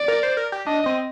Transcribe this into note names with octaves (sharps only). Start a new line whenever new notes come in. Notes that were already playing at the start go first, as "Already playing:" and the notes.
Already playing: D5
A#4
C5
A#4
G4
D4 D#5
C4